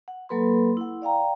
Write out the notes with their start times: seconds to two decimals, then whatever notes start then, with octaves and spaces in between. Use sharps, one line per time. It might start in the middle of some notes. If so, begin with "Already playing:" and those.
0.08 F#5
0.29 F#3 A#3 A4 B4 B5 C6
0.77 E4 F#5
1.02 D5 F5 G5 A#5